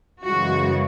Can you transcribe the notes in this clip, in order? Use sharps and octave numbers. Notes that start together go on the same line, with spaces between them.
F#2 C#3 E3 G#3 F#4